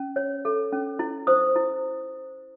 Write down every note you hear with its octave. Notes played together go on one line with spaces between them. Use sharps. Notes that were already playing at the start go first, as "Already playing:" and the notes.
Already playing: C#4
C#5
A4
C#4
E4
C5 D#6
E4